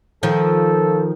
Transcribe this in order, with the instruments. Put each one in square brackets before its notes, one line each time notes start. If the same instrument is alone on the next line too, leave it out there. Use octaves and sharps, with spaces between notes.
[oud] D#3 F3 [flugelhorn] A4